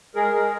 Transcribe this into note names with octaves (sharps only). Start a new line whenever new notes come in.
G#3 G#4 A#4
G#3